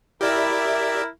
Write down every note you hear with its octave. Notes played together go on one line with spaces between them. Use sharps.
E4 G4 A#4 D5 E5